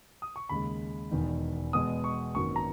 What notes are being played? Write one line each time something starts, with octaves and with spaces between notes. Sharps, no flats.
D#6
C#6
D#2 C#3 G#3 B5
E1 E2 D#3
E2 B2 G#3 B3 D#6
C#6
G#1 F#2 D#3 F#3 A#3 C#6
A#5